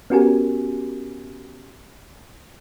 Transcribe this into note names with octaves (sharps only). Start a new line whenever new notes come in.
B3 C#4 F#4 G4 A#4 G#5